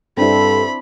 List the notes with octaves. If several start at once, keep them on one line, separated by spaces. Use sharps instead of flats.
G2 C4 D4 E4 A4 B5